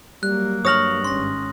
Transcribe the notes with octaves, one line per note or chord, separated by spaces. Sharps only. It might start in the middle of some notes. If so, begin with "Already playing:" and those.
F#3 G3 A#3 F#6
G2 C#5 D#6 F6 A#6 F#7
G#1 C#4 C6 A#6